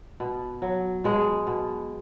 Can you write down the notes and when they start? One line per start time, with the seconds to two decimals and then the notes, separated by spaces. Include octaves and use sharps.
0.20 B2
0.62 F#3
1.04 B2 G#3
1.47 B2